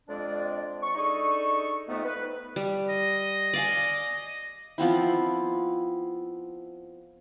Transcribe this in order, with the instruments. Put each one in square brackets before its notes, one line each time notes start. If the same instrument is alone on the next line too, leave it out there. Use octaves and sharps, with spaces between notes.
[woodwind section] F2 G#3 D4 D5
C#6
D4 D#4 G#4 A4 D#5 C#6
F2 A3 B3 D#4
B4
[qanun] G3
[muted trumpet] D#5
[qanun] D5 F5 G#5
F3 B3 C4 E4